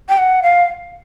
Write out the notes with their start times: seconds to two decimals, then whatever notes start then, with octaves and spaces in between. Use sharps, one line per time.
0.09 G5
0.18 F#5
0.43 F5